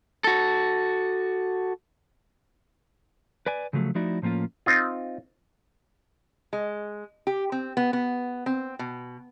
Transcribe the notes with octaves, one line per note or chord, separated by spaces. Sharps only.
F#4 A4
B4 D5 G#5
C#3 F3 F#3 A3
F3 A3 D#4 E4 F#4 D5
A2 F3 A#3 C#4 F4
C4 D#4 F4
G#3
G4
C4
B3
B3
C4
B2